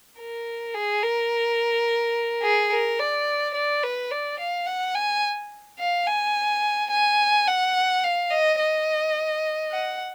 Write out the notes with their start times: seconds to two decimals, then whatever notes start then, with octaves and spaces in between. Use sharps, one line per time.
0.19 A#4
0.75 G#4
1.02 A#4
2.42 G#4
2.71 A#4
2.99 D5
3.54 D5
3.84 B4
4.11 D5
4.39 F5
4.67 F#5
4.95 G#5
5.80 F5
6.07 G#5
6.91 G#5
7.47 F#5
8.03 F5
8.31 D#5
8.59 D#5
9.72 F#5